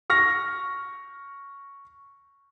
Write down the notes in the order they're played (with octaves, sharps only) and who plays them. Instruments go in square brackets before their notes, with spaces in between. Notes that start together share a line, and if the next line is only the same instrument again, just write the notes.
[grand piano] C#6 F6 A#6